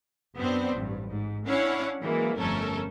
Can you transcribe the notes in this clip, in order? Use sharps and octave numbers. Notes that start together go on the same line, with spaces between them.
F#2 B3 C4 D4 C5
A1 G2
G#2
C#4 D4 E4 C#5 F5 F#5
E3 F#3 G#3 A#3
G1 F2 A3 C#4 A4 A#4